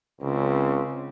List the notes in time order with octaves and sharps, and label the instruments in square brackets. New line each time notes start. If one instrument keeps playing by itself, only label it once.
[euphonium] C#2 [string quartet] C#3 C4